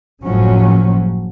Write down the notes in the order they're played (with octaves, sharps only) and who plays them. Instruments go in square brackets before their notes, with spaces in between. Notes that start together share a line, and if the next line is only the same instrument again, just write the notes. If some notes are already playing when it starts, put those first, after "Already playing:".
[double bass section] F#1 A2 F3 F#3 C#4